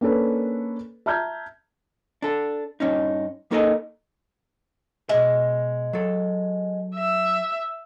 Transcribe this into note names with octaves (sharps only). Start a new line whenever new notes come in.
A#3 C#4 D4 A4 B4
E5 A5 A#5 F6 G6 G#6
D4 A4
G2 C#4 D#4
A#3 D#4 A4 A#4 D5 D#5
B2 G#3 E5
F#3 A4
E5